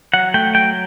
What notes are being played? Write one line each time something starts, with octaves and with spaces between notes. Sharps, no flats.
F#3 F#5
A3 G5
F#3 G5